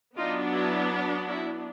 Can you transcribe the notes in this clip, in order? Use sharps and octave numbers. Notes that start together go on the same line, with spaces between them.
F#3 B3 D4 D#4 F4
E4 F#4
E4 F#4